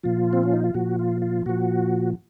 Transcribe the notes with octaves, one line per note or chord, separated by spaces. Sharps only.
A#2 F3 F4
C4
C#4
D#4
F4
A#2 F3 F#4
F4
F4
A#2 F3 F#4